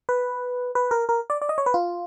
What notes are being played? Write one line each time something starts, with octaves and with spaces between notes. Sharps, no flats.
B4
B4
A#4
A#4
D5
D5
D#5
C#5
B4
F4